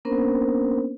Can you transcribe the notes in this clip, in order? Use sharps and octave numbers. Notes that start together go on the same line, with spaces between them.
A#3 B3 C#4 D4 A#4 C5